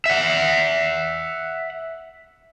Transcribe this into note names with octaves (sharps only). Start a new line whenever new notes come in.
E5 F#5